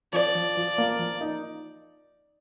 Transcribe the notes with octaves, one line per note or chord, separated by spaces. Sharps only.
F3 D5
F3
F3
A#3
F3
D#4